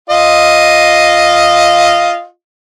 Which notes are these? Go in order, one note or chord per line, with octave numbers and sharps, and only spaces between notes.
F4 D#5